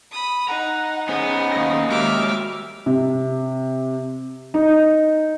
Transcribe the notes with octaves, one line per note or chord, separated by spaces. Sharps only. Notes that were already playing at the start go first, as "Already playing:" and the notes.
B5 D#6
D#4 F#5 A#5
B3 C#4 G#4 C5 F#5
A#3 D#5
G#3 F#4 G4 E5 D6 F6
C3
D#4